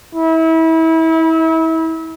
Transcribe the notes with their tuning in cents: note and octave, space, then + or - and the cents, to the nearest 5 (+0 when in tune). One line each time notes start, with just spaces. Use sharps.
E4 -30